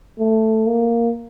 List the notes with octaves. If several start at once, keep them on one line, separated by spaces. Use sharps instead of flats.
A3
A#3